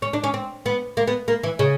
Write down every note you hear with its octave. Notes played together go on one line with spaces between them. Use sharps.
C#4
D4
C#4
C4
B3
A#3
B3
A#3
E3
C#3